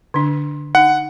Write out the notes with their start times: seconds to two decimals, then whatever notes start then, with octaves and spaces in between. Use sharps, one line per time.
0.14 D3 D4
0.75 D#4 F#5